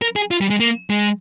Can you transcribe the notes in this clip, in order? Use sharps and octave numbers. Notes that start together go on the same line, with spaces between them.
A#4
G#4
F4
G3
G#3
A#3
G#3